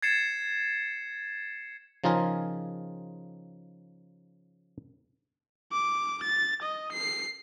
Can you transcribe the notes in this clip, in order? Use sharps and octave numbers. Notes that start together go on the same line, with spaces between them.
G#6 A6 C7 C#7 E7
C#3 F3 D#4 F4 G#4 A#4
D6
A6
D#5
C7